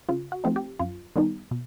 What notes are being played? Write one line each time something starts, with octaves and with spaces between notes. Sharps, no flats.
C#3 F4
F#4
F3 A3 C4 D#4
G4
F#2 F4
D#3 G3 B3 D#4
B2